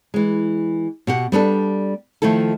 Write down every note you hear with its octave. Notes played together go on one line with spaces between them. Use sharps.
E3 G#3
B2 G4 F#5
G3 B3 D4 A4
D#3 F3 A3 E4 A4